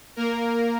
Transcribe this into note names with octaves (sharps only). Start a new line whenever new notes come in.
A#3 A#4